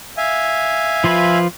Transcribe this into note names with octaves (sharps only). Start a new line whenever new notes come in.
E5 F5 G#5
F3 F4 B4